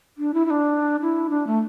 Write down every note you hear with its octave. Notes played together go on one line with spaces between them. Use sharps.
D4
E4
E4
D4
E4
D4
A3